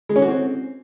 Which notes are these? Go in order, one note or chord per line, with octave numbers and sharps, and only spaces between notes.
G#3
C#4
F#4
C4